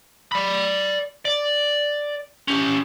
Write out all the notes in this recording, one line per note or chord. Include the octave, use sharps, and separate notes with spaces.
D5 B5
D5
C#4 G4